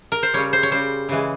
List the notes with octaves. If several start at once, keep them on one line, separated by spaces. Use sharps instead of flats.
A#4
C5
C#3 G3 C#5
C5
C#5
C#3 G3 C5
C#3 E3 G#3